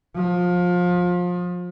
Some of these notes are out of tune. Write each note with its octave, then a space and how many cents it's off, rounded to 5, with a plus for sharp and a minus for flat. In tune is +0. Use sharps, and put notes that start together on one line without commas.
F3 +25